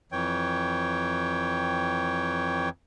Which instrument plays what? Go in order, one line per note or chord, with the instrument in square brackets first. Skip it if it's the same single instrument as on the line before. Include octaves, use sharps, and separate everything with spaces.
[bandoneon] F2 E3 C#5 G5